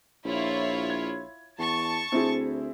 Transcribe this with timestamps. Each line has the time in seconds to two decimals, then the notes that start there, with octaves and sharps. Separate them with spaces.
0.25 A#1 E4 F4 C#5
0.90 G#6
1.58 E2 A5 C#6
2.12 D2 C4 E4 G#4